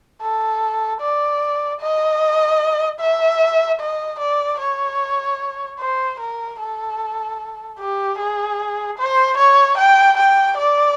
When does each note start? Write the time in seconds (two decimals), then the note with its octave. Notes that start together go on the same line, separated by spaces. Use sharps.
0.22 A4
1.01 D5
1.80 D#5
3.00 E5
3.80 D#5
4.19 D5
4.60 C#5
5.79 C5
6.20 A#4
6.60 A4
7.79 G4
8.18 G#4
8.98 C5
9.37 C#5
9.77 G5
10.17 G5
10.57 D5